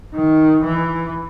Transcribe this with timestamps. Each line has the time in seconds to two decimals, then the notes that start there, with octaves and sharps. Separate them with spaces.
0.14 D#3
0.64 E3